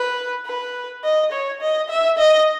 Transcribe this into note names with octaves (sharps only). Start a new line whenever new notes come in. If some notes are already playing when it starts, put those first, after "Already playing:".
Already playing: B4
B4
D#5
C#5
D#5
E5
D#5